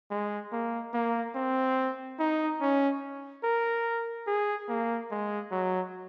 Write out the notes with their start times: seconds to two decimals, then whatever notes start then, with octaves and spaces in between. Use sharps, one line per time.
0.11 G#3
0.53 A#3
0.94 A#3
1.35 C4
2.19 D#4
2.61 C#4
3.44 A#4
4.27 G#4
4.69 A#3
5.11 G#3
5.52 F#3